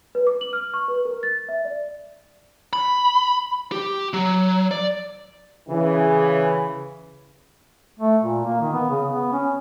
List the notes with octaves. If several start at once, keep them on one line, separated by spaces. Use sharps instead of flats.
B4
D6
F#7
F6
C#6
B4
A#4
A6
E5
D5
B5
G4
F#3
D5
C#3 E3
A3
A#2
A#3
D#3
B3
C#3
B3
C#4